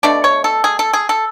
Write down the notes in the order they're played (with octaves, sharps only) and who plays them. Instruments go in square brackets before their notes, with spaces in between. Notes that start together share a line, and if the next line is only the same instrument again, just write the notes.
[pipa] B2 A3 D4 D5
C#5
A4
G#4
A4
G#4
A4